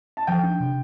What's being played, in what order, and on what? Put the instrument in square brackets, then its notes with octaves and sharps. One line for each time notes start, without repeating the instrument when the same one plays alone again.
[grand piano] A5
[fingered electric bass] F3 [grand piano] G5
[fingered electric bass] D4
C3